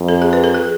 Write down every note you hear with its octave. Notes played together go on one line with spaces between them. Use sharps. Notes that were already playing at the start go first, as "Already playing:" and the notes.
Already playing: F2
A4
G#4
B4
A4
G#4